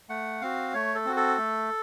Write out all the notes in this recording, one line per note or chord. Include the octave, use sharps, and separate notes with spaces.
A3 F#5
C4 F#4 F5
A3 C#5
A4
C4 F#4
A4
A3